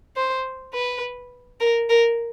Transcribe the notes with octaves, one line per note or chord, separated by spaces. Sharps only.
C5
B4
A#4
A#4